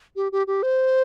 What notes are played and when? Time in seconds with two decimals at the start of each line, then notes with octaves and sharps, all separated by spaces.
0.16 G4
0.32 G4
0.47 G4
0.63 C5